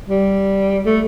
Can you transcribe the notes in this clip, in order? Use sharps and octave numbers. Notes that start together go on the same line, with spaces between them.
G3
A3